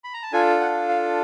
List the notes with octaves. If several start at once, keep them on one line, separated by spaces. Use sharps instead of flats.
B5
A#5
A5
D4 F4 A4 G#5
F#5
F5